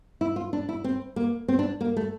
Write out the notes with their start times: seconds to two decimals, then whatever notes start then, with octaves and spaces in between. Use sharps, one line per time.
0.21 E4
0.36 F4
0.53 D4
0.69 E4
0.84 C4
1.16 A#3
1.48 C4
1.59 D4
1.81 A#3
1.97 A3